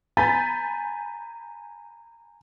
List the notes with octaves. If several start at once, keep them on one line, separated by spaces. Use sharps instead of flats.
G#5 A#5 B5 G6 A6 B6